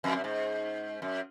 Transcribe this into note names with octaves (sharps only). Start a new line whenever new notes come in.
F2
F#2
G#2
F#2